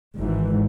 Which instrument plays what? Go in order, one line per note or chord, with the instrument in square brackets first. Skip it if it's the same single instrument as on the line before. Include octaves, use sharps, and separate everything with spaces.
[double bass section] G#1 G#2 E3